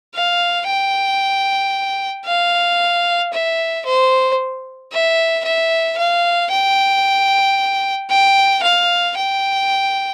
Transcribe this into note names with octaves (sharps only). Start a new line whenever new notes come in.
F5
G5
F5
E5
C5
E5
E5
F5
G5
G5
F5
G5